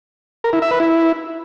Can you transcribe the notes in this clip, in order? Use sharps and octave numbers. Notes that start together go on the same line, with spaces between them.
A#4
E4
E5
B4
E4